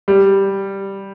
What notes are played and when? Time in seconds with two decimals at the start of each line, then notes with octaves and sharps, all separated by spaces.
0.08 G3